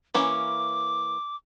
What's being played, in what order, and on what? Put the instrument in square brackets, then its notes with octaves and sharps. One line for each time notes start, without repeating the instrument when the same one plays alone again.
[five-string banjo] E3 A#3 C#4 [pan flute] D6